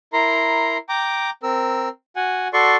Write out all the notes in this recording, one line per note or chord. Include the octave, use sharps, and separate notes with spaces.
E4 A#4 A#5 C6
G5 A#5 D6
C4 A#4 E6
F#4 F#5 G#5
F#4 A4 D5 C6 C#6